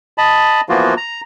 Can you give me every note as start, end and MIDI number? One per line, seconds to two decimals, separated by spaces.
0.18 0.61 75
0.18 0.61 81
0.18 0.61 83
0.69 0.94 52
0.69 0.94 53
0.69 0.94 58
0.69 0.94 59
0.69 0.94 65
0.69 0.94 66
0.97 1.21 82